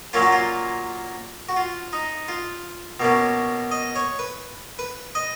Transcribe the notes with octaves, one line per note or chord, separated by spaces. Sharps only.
A#2 F#3 A#3 C#4 F4
F#4
F4
F#4
F4
D#4
F4
B2 A#3 C#4
D#5
C#5
B4
B4
D#5